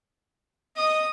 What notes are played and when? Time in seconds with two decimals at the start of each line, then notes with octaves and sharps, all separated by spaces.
0.77 D#5 D#6